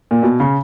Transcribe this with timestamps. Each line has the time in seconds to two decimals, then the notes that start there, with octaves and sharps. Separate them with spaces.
0.11 A#2
0.23 B2
0.40 C#3